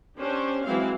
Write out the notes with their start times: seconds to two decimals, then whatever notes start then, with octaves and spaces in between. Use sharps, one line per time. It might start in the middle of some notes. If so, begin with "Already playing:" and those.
0.19 C#4 D4 G4 C5
0.65 E3 F#3 G#3 C4 E4 F5